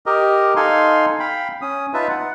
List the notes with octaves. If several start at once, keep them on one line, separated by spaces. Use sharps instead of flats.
G4 A#4 D#5
D#4 A4 F5 G#5 C6
F5 G5 B5
C#4 D#6
D#4 F4 B4 E5 A5
F#5